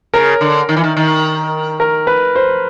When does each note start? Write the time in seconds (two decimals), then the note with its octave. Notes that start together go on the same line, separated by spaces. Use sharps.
0.13 C#3 A#4
0.41 D3
0.69 D#3
0.77 E3
0.84 D#3
0.97 D#3
1.80 A#4
2.07 B4
2.35 C5